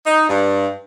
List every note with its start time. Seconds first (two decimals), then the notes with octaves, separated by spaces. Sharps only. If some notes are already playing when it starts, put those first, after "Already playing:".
0.06 D#4
0.28 G2